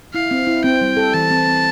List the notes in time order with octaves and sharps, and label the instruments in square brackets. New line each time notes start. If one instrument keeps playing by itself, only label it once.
[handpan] E4 [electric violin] F5
[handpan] C4
E4
[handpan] C4 [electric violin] G5
[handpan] G3
A4
[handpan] E3 [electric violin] A5
[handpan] C4
C4